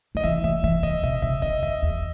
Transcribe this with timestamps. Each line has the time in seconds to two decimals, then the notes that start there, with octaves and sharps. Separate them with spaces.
0.15 D#3 D#5
0.24 E3 E5
0.44 E3 E5
0.64 E3 E5
0.83 D#3 D#5
1.03 B2 E5
1.22 C#3 E5
1.42 D#3 D#5
1.62 F#2 E5
1.82 E2